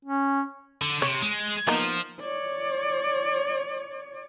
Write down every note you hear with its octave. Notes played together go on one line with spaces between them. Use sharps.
C#4
D3
C3 C#5
G#3
F3 A#3 B3 D#4
C#5 D5